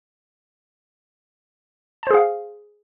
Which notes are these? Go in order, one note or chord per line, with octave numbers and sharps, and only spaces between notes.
G#4 C5 F5 A5